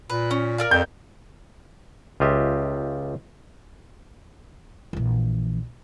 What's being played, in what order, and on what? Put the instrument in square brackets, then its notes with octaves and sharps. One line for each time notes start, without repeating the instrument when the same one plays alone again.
[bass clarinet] A#2 [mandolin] B4
[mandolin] C#4
A#4 D5 F5
[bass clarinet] F2 [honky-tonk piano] G6
[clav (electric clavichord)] C#2 F4 G4 D#5 E5
[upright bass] A#1 E3